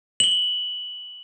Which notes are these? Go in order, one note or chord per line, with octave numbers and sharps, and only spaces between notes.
F#7 G7